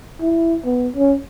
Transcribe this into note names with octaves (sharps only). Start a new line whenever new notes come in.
E4
B3
C#4